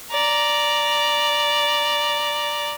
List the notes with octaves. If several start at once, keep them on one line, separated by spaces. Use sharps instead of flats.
D5 A#5